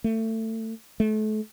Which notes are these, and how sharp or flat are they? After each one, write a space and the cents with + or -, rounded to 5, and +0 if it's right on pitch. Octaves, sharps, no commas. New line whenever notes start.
A3 +25
A3 -35